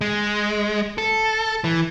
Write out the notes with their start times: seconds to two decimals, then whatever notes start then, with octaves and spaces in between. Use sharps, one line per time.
0.01 G#3
0.98 A4
1.64 E3